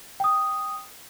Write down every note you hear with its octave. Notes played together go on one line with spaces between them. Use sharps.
G5 D#6